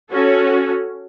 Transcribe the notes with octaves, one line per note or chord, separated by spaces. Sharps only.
C#4 F#4 A4